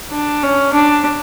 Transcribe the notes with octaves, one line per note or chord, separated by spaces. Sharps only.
D4
C#4
D4